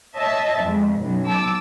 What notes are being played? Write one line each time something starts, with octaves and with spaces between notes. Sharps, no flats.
C#5 D#5 E5 A5
F2 G#3
B1 F#2 B2
A5 D6 E6